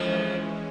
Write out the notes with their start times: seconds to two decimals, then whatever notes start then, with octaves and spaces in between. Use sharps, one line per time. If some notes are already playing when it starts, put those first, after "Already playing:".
Already playing: F2 E3 F3 G#3 C#4